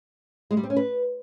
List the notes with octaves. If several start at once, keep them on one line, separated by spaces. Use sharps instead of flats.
G#3
G3
C4
C#4
B4